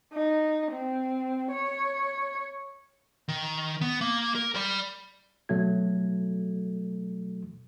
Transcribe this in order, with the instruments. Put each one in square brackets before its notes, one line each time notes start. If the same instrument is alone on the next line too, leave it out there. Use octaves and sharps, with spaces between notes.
[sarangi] D#4
C4
C#5
[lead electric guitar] D#3
B3
A#3
A#4
D5 B5
[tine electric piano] B2 F#3 A3 A4 G#6